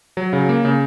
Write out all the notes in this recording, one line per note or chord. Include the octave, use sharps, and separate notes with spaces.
F#3
C#3
A#3
C#3